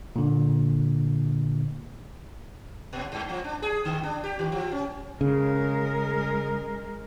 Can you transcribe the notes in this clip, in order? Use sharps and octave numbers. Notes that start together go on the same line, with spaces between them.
A#2 D3
A#2
G2
F3
D4
G#4
D3
D4
G4
D#3
F3
C#4
C#3 G#3 A#4